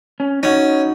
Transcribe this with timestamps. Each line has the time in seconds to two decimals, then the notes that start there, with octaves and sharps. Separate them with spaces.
0.20 C#4
0.43 C#4 D#4 F#4